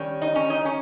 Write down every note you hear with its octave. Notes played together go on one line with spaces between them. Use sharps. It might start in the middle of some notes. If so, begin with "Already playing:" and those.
Already playing: D#3 G3 C#4
D#4
C#4
D#4
C#4